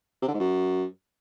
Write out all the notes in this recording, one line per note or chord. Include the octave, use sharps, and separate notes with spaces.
C3
D3
G#2
F#2